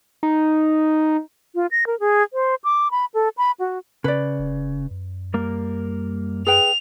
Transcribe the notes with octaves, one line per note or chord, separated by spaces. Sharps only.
D#4
F4
A#6
A#4
G#4
C5
D6
B5
A4
B5
F#4
C#3 B4 D5
F1
F#2
G3 A#3 A#4
G#4 B4 G5 F7